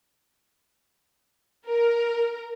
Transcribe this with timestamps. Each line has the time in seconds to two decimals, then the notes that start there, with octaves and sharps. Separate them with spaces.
1.66 A#4